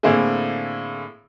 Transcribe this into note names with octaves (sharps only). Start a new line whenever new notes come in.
A2 D3 A#3 C4 E4 G#4